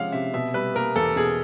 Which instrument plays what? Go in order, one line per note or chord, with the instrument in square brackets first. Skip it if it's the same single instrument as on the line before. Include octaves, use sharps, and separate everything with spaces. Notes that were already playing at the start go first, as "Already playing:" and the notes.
Already playing: [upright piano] C3 F3 G#3 C#4 [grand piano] F5 F#5
[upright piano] C3 [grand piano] E5
[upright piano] B2 [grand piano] E5
[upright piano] G3 [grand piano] B4
[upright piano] A#3 [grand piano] A#4
[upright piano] E2 [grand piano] A4
[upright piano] B2 [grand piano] G#4